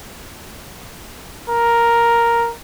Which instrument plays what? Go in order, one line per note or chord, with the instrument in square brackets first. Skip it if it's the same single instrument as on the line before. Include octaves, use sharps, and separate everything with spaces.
[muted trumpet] A#4